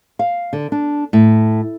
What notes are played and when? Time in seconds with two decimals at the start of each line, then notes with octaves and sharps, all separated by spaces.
0.19 F5
0.53 D3
0.72 D4
1.13 A2